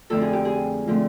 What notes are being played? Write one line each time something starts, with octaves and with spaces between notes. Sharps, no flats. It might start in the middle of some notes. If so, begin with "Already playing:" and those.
F2 D3 F3 A3 C4 A4
G#4
G4
G#4
D3 F3 A3 C4